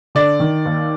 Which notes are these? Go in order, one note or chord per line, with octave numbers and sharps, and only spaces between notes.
D3 D5
D#3
D#2